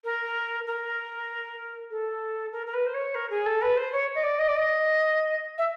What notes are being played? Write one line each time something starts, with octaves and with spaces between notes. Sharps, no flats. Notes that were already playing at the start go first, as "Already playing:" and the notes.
A#4
A#4
A4
A#4
A#4
B4
C5
C#5
A#4
G#4
A4
B4
C5
C#5
D#5
D5
D#5
D5
D#5
E5